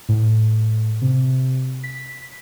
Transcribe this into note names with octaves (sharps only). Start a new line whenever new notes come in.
A2
C3
B6